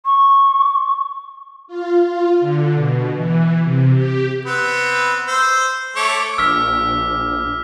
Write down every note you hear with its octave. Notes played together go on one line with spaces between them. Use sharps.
C#6
F4
F4
D3
B2
E3
C3
G4
B3 C4 B4
C5 E6
A3 C#5 D6
A#1 D6 E6 F6 B6